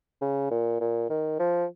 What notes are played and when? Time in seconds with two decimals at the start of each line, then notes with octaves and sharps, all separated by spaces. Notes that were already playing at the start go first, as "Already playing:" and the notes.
0.21 C#3
0.51 A#2
0.81 A#2
1.10 D#3
1.39 F3